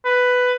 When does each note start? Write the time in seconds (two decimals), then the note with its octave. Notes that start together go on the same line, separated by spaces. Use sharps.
0.05 B4